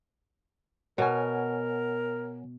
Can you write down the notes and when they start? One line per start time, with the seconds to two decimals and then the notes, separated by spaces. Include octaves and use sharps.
0.98 B2 A#4 C#5 F#5 G#5